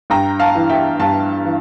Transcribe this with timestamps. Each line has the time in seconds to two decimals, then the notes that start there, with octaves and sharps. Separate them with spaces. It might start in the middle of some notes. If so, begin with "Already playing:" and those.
0.10 G2 G5 A#5
0.40 F5 A5
0.55 E3
0.70 E5 G5
0.99 G2 F5 A5
1.44 E3